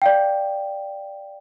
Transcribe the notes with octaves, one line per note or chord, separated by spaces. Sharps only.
D5 F5 G5